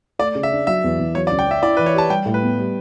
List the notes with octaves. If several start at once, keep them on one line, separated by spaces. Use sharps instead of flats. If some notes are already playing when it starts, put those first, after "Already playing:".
A3 D5
C#3
E5
D4
F#3 E5
E2
E2
F#3 C#5
D5
C#2
G5
C#4 E5
E4 D5
E3 B4
C#5
G4 A5
G3 G5
A2
B4
B3
G3